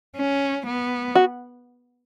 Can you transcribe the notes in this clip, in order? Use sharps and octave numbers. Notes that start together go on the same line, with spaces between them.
C#4
B3
F#4